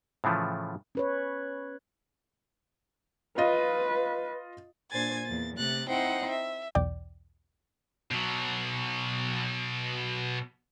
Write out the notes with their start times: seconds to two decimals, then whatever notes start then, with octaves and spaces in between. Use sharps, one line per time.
0.24 A2 C#3 E3 F3 A3
0.95 C#4 B4 C#5
3.38 F4 B4 D#5
4.91 A#2 D4 C5 G#5 G#6 A6
5.26 E2 A#3 A6
5.57 C3 A3 F#6 A6
5.88 C4 D#4 E4 C5 F#5 G5
6.30 E5
6.75 B1 E2 D5 G5
8.11 B2 F#3